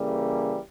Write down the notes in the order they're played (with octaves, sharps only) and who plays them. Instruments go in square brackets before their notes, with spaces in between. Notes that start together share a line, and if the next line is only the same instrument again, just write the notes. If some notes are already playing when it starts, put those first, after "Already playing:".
Already playing: [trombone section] C#3 E3 G3 A#3